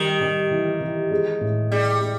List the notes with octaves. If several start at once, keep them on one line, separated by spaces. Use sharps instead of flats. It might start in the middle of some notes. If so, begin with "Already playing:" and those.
Already playing: D#3 G3
G3
E3
E3
G#3
A2
G3 G#3
G#3